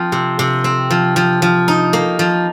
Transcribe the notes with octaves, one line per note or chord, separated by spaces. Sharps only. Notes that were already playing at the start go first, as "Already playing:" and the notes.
Already playing: F3 C4
C3
C3
C4
F3
F3
F3
D#4
A#3
F3